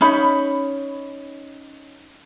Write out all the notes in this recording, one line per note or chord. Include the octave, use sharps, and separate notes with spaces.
C#4 D#4 B5